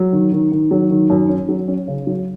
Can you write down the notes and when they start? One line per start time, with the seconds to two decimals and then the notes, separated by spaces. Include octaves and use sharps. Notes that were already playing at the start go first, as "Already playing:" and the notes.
Already playing: F#3
0.13 D#3
0.32 D#3
0.52 D#3
0.71 F#3
0.90 D#3
1.10 F#2
1.29 C#4
1.49 F#3
1.68 C#4
1.88 C#3
2.07 F#3